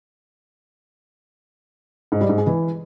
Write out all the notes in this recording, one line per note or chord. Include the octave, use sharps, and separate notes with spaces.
G#2
G3
G#2
G#3
E3